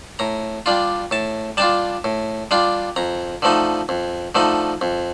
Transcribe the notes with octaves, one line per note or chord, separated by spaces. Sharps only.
A2 A#5
G3 D4 F4
A2 A5
G3 D4 F4 A5
A2
G3 D4 F4
F2 A#5
D3 F3 A3 D#4
F2
D3 F3 A3 D#4
F2